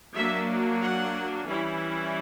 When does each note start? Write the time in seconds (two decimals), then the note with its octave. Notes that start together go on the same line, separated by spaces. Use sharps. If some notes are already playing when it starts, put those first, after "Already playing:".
0.15 F#3 A#3 D4 E5
0.82 F#5
1.48 E3 G3 C#4 E4